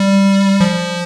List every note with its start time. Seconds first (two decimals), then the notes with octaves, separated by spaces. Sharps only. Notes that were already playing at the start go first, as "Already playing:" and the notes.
Already playing: G3
0.60 F3